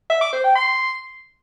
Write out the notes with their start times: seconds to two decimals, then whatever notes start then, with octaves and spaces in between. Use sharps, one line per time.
0.10 E5
0.21 D6
0.33 C5
0.44 G5
0.56 C6